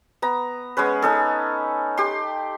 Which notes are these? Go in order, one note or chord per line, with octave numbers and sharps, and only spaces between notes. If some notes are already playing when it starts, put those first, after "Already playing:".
B3 A#5
G#3 B3 C#4 B4
C#4 D#4 A4
G4 C6